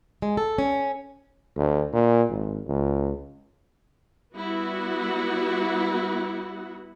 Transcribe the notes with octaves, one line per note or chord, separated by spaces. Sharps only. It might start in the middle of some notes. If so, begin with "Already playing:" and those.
G#3
A4
C#4
D2
A#2
G#1
C#2
G3 B3 E4 F#4 F#5